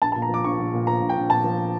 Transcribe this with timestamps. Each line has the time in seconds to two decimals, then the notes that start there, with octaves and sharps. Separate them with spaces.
0.02 A#1 A5
0.12 A5
0.16 A#2
0.22 A#5
0.29 F3 D6
0.44 A#1 C#6
0.59 A#1
0.74 A#2
0.87 F3 A#5
1.02 A#1
1.09 G5
1.17 A#1
1.30 A#2 A5
1.44 F3